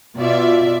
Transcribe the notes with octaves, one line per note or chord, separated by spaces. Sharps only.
B2 F4 D5 E5